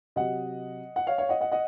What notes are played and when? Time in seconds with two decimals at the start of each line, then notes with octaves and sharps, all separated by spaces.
0.16 C3 F#3 D#5 F#5
0.96 F#5
1.07 C#5 F5
1.18 C#5 F5
1.29 D#5 F#5
1.40 D#5 F#5
1.52 D#5 F#5